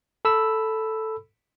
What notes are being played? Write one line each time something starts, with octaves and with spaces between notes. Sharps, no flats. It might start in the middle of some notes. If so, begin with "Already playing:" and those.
A4 B5 E6